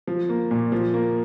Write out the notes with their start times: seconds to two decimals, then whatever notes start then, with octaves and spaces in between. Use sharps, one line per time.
0.07 F3
0.29 A#3
0.51 A#2
0.72 F3
0.94 A#3